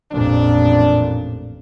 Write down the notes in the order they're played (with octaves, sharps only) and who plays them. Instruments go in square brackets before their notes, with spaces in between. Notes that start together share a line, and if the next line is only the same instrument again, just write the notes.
[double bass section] A1 F2 A#2 [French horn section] D4